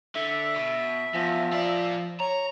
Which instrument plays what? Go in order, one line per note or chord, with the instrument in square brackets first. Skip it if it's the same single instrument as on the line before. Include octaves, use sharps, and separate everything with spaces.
[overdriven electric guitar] D3 [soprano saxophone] E5
[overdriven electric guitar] B2
[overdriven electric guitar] E2 [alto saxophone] F3
[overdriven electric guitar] F4 D5
[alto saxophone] C#5 [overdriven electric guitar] A#5